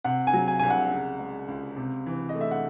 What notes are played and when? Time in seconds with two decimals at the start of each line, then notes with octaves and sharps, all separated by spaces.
0.05 C3 F#5
0.27 G#5
0.34 F#3
0.48 G#5
0.59 C2 G#5
0.70 F#5
0.91 C#3
1.19 G#3
1.48 C#2
1.77 C3
2.07 E3
2.29 D#5
2.35 A3
2.41 E5
2.51 F#5